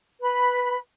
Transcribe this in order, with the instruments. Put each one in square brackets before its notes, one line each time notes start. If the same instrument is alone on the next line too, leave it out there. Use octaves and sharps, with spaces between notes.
[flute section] B4 B5